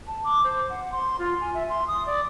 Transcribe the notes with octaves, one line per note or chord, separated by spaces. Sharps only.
A5
D6
C5
F#5
C6
F4
G#5
E5
C6
D#6
D5